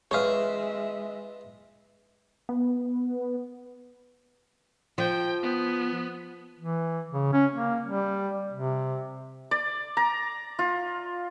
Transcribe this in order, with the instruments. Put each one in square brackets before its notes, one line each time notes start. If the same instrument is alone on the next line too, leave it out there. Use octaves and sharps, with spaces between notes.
[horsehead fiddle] G#3 E5 [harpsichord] F4 G#4 B4 [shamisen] C#5 F5
[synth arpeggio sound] B3
[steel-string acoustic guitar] F3 [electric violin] G5
[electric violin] B3
[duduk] E3
C#3
C#4
A#3
G3
C3
[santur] D5
A#5
F4